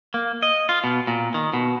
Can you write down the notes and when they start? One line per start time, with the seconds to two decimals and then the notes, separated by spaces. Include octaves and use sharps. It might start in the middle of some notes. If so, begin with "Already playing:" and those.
0.14 A#3
0.43 D#5
0.69 F4
0.84 B2
1.07 A#2
1.34 D#3
1.53 B2